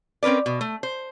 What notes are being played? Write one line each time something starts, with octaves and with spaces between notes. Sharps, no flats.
C4 C#4 A#4 B4 D5
B2
A3
C5